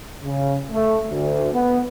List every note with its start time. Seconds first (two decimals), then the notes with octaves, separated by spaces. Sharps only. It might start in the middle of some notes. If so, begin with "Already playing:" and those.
0.24 C#3
0.71 A3
1.09 D2
1.52 B3